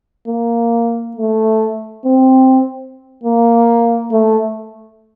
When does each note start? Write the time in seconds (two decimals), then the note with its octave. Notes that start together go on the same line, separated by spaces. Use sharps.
0.28 A#3
1.16 A3
2.05 C4
3.23 A#3
4.12 A3